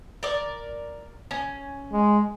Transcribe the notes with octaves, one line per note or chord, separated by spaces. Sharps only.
A#4 D5
C#4
G#3